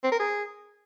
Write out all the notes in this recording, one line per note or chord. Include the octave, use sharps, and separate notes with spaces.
C4
A#4
G#4